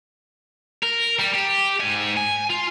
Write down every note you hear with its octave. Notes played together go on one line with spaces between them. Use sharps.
A#4
G3
G4
G#2 G#5
G#5
F4